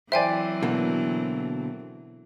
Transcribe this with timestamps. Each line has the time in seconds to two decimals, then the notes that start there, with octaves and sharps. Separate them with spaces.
0.12 E3 F#3 C4 C5 D5 E5 G5 G#5
0.62 B2 D3 A#3